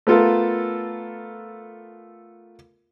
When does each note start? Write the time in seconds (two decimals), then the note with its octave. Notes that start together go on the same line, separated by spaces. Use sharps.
0.07 A3 B3 F4 A4 A#4